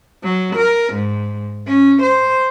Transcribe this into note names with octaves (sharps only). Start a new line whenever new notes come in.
F#3
A#4
G#2
C#4
C5